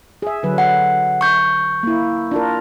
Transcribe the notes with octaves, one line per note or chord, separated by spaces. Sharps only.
G#4 E5
D3 F#3 B4
F#5
C#6 G6
A#3 E4
D4 F4 A#4